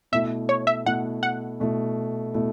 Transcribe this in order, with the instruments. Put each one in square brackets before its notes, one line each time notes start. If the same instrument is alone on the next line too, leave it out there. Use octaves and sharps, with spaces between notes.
[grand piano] B2 A3 E4 [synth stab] E5
[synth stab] C#5
E5
[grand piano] B2 A3 E4 [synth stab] F#5
[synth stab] F#5
[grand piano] B2 A3 E4
B2 A3 E4